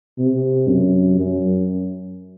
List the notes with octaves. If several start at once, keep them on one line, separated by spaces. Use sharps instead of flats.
C3
F#2
F#2